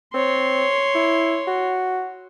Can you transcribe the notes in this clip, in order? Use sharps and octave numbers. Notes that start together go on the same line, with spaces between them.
C4 C#5 C6
E4
F#4